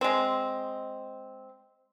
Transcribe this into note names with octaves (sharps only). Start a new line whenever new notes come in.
G#3 C4